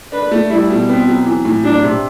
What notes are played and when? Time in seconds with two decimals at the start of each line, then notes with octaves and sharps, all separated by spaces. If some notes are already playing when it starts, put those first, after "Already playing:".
0.12 D4 B4
0.31 A3
0.50 G3 E4
0.70 B2
0.89 B3 C4
1.08 F#3
1.26 E3
1.45 A2
1.64 F#3 D4
1.83 C3